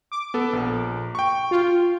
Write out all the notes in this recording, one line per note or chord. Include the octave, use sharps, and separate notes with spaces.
D6
B3 A4
A#1
G5 C#6
F4